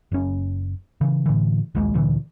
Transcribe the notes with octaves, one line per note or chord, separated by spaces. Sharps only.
F#1 C#4
C#3 E3
A2 D3 E3
A#1 D#2 D#3 G#3
D2 A#2 D3 E3